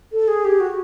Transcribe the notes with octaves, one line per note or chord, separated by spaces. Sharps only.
A4
G#4
G4
F#4